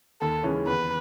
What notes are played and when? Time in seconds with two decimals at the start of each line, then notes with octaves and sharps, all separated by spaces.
0.21 D#2 A4
0.43 C#3 E3 G#3 C#4
0.67 E2 B4